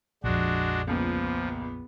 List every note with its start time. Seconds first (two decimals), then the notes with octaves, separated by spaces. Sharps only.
0.24 A#1 F2 G#3 D4 F#4
0.87 C#2 A#2 F3 B3